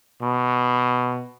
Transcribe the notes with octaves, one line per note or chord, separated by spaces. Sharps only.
B2